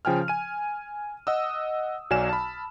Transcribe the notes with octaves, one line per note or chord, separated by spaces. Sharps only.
C#3 F3 G5 G#5 F6
G#5 D#7
D#5 F#5 D#6 E6
B1 F#3 D5 G#5 F6 E7
A5 B5